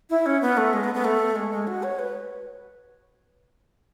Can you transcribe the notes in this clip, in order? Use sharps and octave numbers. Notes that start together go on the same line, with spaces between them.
E4
C#4
B3
A3
G#3
B3
B3
A3
G#3
G#3
F#4
C#5
B4